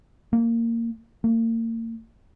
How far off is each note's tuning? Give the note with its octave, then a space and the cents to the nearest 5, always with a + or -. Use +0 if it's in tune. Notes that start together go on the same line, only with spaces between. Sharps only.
A#3 -15
A#3 -40